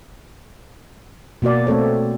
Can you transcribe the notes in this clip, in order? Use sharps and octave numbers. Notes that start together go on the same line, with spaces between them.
B2 A#3 F#4 D5
A3 C4 A4 C#5